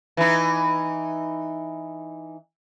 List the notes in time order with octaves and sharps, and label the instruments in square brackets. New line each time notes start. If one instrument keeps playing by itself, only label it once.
[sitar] E3 D#4